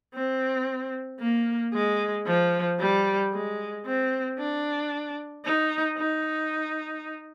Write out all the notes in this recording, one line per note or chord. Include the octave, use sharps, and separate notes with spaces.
C4
A#3
G#3
F3
G3
G#3
C4
D4
D#4
D#4